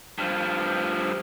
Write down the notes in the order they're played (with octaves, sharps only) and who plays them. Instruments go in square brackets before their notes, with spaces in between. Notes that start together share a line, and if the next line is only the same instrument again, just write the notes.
[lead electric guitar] G2 F3